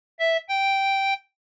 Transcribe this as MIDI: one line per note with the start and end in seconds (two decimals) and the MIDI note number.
0.20 0.37 76
0.49 1.13 79